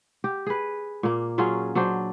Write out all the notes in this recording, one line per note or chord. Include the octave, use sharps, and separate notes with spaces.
G4
G#4 B4
A#2 A#3
F#3 C#4 F4 G#4
F#3 D4 C5